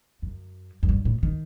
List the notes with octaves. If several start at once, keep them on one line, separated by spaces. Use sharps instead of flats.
F#2
F#2
G2
A2
D#3